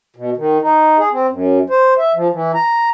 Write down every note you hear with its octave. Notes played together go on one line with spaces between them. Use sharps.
B2
D#3
D#4
G#4
C4
F#2
C5
E5
F3
E3
A#5